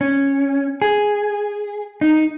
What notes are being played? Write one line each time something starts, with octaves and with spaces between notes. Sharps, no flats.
C#4
G#4
D#4